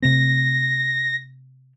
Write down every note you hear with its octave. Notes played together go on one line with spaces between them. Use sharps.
C3 A3 C4 A#6